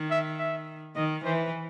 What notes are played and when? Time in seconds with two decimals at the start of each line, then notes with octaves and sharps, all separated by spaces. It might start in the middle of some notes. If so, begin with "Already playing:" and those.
Already playing: D#3
0.11 E5
0.39 E5
0.96 D#3 D#5
1.24 E3 C5